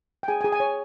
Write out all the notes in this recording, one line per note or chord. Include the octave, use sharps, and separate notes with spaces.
G5
G#4 G#5
G#5
G#4
G#5
C#5